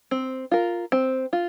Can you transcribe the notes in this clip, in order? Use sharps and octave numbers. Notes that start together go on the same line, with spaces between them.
C4
F4 A#4
C4
F4